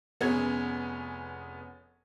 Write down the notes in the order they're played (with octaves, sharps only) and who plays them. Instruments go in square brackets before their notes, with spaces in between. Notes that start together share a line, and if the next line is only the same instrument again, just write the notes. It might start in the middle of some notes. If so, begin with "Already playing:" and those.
[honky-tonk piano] F1 B3 C#4 G#4 G#6